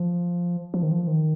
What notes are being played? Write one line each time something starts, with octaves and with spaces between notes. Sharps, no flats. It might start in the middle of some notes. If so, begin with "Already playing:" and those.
Already playing: F3
F3
D#3
F3
D#3